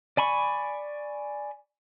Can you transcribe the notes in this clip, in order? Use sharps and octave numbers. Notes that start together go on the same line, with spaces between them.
D5 G#5 B5 C#6